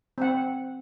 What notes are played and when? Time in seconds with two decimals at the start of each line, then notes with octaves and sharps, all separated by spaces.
0.18 C4 F#5